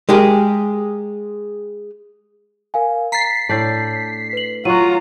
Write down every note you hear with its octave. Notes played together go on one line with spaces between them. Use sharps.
G#3 G4 G#4 A#4
A#4 F5 G#5
A#5 A6 B6 C7
A2 D4 D5 A5 G6 A6
B4 F#7
F#3 F4 F#5 A#5 C#6 D#7